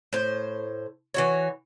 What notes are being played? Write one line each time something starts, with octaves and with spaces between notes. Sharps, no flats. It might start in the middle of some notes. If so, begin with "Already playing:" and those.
A2 C5
E3 F#4 C#5